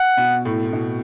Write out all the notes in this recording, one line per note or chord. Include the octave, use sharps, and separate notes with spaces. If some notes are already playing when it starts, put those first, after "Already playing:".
Already playing: F#5
B2
A2
A2
B2